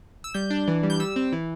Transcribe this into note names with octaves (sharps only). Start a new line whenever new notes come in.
E6
G3 G6
D4
E3
G3
G6
G3 E6
C4
E3